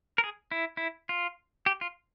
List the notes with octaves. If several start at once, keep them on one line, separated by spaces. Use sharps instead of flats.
A#4
G#4
E4
E4
F4
G4
F4